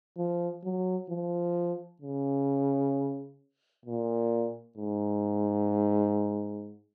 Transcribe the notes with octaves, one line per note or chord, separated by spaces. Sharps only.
F3
F#3
F3
C#3
A#2
G#2